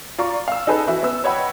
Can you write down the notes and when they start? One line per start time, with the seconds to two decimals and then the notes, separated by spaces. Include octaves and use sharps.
0.18 F4 D5 A#5 C#6
0.48 F5 E6
0.67 D#4 G#4 A4 B4
0.87 E3 E4 F#4
1.03 B3 E6
1.24 B4 C#5 D#5 F#5 G5 B5